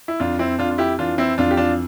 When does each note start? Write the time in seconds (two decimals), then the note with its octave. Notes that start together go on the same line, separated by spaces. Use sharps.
0.08 E4
0.20 F2 D4 F4
0.39 C4 E4
0.58 F2 D4 F4
0.71 F4
0.78 E4 G4
0.99 E3 D4 F4
1.18 C4 E4
1.38 F2 D4 F4
1.51 G4
1.57 D4 F4